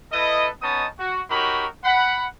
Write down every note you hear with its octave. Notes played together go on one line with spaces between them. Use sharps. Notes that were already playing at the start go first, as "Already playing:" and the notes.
E4 A4 B4 D#5
B3 C#4 D#4 D#5 A5 D#6
F#4
D#4 F#4 G4 A#4 C#5 B5
F#5 B5